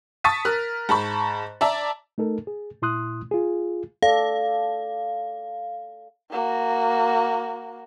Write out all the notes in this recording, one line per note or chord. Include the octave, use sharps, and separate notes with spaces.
A5 C#6 D#6 A6 B6 D#7
A#4 F6 F#6
G#2 A5 B5 C#6
D5 E5 A5 A#5
A3 D#4 A4 A#4
G#4
A#2 E4 C6 D#6 F#6
F4 G#4
A4 D5 F5
A#3 F#4